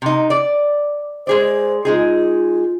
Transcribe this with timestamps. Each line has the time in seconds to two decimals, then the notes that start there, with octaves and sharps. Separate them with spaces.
0.02 C3 D#4
0.30 D5
1.27 G#3 G#4 C5 D5
1.85 G#3 D#4 F4 G#4